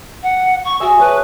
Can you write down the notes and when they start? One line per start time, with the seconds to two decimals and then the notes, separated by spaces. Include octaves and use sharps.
0.23 F#5
0.64 C#6
0.80 F#4 G#4 E5
0.99 B4 C#5 A5